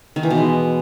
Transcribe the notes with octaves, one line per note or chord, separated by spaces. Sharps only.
D#3
E3
B2
G#3